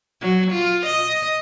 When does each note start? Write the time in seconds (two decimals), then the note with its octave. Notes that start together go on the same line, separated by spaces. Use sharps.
0.21 F#3
0.51 F4
0.86 D#5